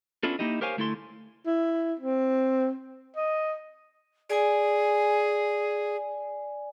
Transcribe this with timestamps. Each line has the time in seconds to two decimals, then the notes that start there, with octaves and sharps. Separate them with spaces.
0.23 B3 C#4 D4 E4 F4 A4
0.39 A#3 D#4 E4 G4 D#5
0.61 G4 A#4 C5 C#5 F5 G#5
0.77 D2 A3 E4 A4 C6
1.46 E4
1.99 C4
3.16 D#5
4.30 G#4 D5 G#5